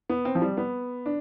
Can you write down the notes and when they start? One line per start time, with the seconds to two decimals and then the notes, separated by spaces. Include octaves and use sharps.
0.10 B3
0.25 C4
0.35 F3
0.42 G3
0.57 B3
1.06 D4